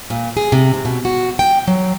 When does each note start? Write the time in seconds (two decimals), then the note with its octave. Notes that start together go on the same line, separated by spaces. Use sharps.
0.10 A#2
0.37 G#4
0.52 C3
0.74 C3
0.85 B2
1.05 F#4
1.39 G5
1.68 F#3